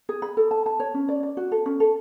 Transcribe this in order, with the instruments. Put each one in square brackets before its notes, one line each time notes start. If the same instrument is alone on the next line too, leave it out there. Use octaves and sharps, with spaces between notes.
[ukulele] G#4
B5
A4
A5
A5
C#5
C#4
D5
D5
F#4
A4
C#4
A4